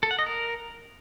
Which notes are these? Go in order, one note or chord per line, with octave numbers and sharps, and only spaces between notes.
A4
F#5
D#5
A#4